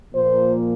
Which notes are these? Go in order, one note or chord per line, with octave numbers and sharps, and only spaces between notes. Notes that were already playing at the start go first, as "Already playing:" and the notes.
A#2 F3 A#3 C5